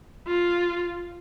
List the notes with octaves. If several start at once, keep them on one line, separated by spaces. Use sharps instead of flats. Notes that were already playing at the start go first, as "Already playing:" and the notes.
F4